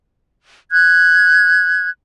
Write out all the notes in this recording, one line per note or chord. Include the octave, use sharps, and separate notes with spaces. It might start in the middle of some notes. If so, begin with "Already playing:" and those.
F#6 G#6